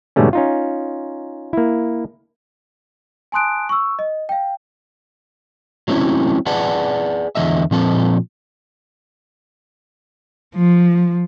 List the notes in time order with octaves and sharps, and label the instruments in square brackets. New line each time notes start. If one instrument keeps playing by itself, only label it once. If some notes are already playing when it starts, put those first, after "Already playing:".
[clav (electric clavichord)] G#2 B2 D3 G3 A3 C#4
C#4 D#4 F4
A#3 E4
[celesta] G#5 A5 C6 D#6 F#6 D7
C#6 E6
D#5
F5 G5
[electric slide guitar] F#3 A3 C4 C#4 E4
G#4 B4 D5 F#5 A5
E2 D3 A3 D#5 E5
A#2 F3 C4 A4
[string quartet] F3